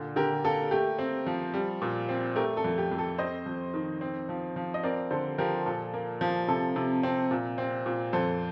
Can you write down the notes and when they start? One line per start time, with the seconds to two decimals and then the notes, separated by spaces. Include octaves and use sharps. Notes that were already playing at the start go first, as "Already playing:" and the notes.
Already playing: A#2 D3
0.16 D3 G4 A#4
0.44 A#3 A4
0.71 A3 G4
0.99 C4
1.27 F3
1.54 G3
1.82 A#2
2.09 C4
2.36 A3 G4 A#4
2.57 A4
2.64 F2
2.78 G4
2.92 F2
2.98 A4
3.18 C4 C5 D#5
3.46 F2
3.74 D#3
4.01 C4
4.29 F3
4.56 F3
4.74 D#5
4.83 C4 A#4 D5
5.11 D3 A4 C5
5.38 F3 G4 A#4
5.66 A#2 A4
5.94 A#3
6.21 F3
6.48 C3 A4
6.76 C3
7.03 C4
7.31 A#2
7.58 C4
7.86 A#2
8.13 F2 A4 C5